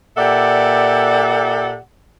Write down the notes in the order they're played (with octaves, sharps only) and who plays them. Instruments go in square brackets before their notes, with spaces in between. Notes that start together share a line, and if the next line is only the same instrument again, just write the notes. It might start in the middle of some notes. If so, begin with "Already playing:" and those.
[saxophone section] A#2 G4 A4 D5 E5 F#5